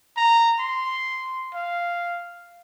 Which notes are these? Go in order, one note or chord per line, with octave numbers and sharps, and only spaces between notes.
A#5
C6
F5